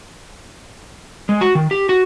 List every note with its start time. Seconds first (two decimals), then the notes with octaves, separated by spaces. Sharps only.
1.29 G#3
1.41 F#4
1.55 D#3
1.71 G4
1.89 F#4